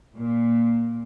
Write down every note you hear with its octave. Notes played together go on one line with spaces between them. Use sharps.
A#2